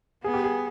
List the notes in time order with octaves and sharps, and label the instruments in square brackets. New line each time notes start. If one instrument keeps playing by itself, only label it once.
[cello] B3 [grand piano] G#4
[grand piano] G4
G#4